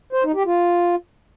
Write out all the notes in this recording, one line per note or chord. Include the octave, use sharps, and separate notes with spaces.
C5
D#4
G4
F4